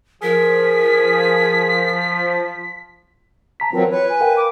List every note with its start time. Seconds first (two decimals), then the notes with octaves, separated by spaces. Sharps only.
0.23 F3 G#4 A#4 B6
3.60 A5 A#5 B6
3.73 E3 F#3 C4 F4 A#4
3.91 B4 C#5
4.09 G#5
4.21 A#4 F5 G5
4.36 D6